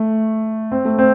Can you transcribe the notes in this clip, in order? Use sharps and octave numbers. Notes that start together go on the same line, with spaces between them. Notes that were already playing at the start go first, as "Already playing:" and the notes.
Already playing: A3
C4
A3
C4